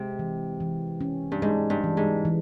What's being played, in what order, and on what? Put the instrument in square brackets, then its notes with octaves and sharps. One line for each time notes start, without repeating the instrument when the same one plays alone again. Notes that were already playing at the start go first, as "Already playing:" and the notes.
Already playing: [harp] C3 [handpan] G#3
[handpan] E3
E3
C#4
[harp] G2
[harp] G#2 [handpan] G#3
[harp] G2
[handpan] E3
[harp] G#2
[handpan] E3